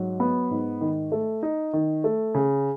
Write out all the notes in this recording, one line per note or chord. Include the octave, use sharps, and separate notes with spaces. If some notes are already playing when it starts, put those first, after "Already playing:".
Already playing: G#2 F#3
B3
G#2
D#3
A3
D#4
D#3
A3
C#3